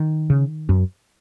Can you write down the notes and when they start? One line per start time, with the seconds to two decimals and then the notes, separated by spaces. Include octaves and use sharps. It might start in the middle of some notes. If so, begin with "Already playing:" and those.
Already playing: D#3
0.30 C#3
0.69 F#2